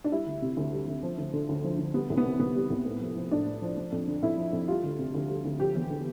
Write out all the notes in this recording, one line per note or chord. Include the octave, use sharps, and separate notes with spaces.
D4
G3 E4
D2
C3
D2
G3
D2
F3
D2
D3
D2
F3
D2
G3 B3
C2
B3
C3
C2 B3
G3
C2
A2
F3
F3
A2 D4
A2
F3
F3
F2
D3
F2 E4
F3
F2
G3 F4
D2
C3
D2
G3
D2
F3 G4
E2
D3